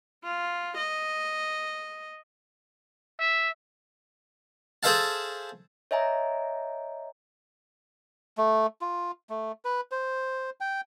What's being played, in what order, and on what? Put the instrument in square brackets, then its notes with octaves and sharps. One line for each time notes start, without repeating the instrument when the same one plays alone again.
[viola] F4
D#5
[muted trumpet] E5
[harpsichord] G#4 A4 C5 E5 F5 A5
[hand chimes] C#5 D#5 E5 G#5 A#5
[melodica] A3
F4
A3
B4
C5
G5